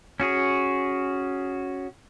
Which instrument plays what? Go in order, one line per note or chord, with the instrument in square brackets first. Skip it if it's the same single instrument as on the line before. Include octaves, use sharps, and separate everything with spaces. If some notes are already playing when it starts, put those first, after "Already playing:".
[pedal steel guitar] C#4 F#4 G#4